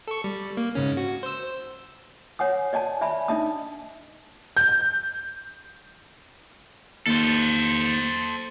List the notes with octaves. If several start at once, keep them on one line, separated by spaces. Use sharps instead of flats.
A4 C#6
G3
A#3
G#2 C#3 C#4
F#4
C5 E6
C#5 F#5 G#5 D#6
D5 D#5 G#5 A5
D5 E5 G#5 B5
D4 D#4 D#5 E5 A5 D#6
G6
D#2 A4 C5